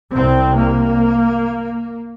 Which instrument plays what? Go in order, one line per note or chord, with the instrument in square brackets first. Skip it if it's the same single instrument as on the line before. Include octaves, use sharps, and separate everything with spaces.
[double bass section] C2 C3 C4
A#3